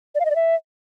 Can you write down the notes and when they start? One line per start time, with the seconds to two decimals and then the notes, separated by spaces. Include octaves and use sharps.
0.15 D5
0.20 F5
0.25 D#5
0.30 D5
0.36 E5